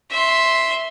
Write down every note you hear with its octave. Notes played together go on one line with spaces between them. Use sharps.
E5 C6